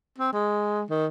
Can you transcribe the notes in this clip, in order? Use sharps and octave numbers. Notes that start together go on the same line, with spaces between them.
C4
G#3
D#3